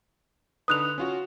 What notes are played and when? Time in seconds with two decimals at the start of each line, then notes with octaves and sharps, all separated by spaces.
0.68 D3 D#4 B4 D#6 F#6 F7
0.98 C#4 F4 F#4